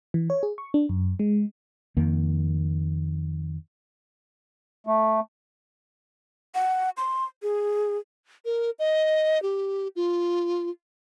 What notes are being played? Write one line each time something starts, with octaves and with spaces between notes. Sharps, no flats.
E3
C#5
G#4
C#6
D4
F#2
G#3
F2 D#3 A#3
A3
F#5
C6
G#4
A#4
D#5
G4
F4